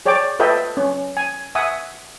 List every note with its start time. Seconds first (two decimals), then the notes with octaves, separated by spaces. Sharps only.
0.05 G#4 C#5 D5 G5 A5 D6
0.39 F4 A4 B4 D#5 E5 G5
0.77 C#4
1.17 G#5
1.55 E5 F#5 G#5 D#6